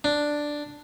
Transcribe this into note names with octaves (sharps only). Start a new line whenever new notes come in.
D4